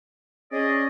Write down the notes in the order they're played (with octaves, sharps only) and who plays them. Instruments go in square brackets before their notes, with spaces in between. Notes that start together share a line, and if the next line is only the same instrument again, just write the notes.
[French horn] C#4 [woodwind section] G#4 D5 D#5